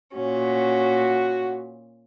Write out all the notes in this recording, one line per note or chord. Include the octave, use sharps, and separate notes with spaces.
A#2 C#4 F#4